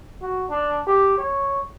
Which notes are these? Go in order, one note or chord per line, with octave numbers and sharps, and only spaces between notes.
F#4
D4
G4
C#5